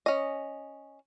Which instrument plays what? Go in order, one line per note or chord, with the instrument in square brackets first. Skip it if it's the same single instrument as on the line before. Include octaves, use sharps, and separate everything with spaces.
[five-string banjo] C#4 D#5